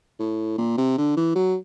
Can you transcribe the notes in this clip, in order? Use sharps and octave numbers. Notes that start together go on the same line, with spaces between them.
A2
A#2
C3
D3
E3
F#3